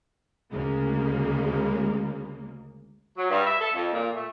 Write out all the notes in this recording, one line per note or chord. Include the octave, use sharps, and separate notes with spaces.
D2 C#3 G#3 A#3
F#3
G2
E5
A4
F2
A#2
A3